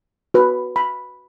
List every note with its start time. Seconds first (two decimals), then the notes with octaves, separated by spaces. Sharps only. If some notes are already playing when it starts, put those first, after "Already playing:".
0.34 F#4 B4
0.76 B5